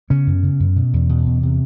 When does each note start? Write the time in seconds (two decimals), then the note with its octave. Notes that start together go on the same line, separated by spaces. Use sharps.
0.10 C#3 B3 C#4
0.27 F#2
0.43 C#3
0.60 F#2
0.76 B2
0.93 E2
1.09 B2
1.26 E2
1.43 C3